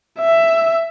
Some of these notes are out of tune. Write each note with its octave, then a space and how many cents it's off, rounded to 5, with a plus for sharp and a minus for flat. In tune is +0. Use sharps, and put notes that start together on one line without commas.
E5 +10